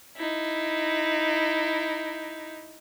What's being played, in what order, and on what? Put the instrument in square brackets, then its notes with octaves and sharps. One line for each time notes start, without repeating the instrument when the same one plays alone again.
[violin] D#4 E4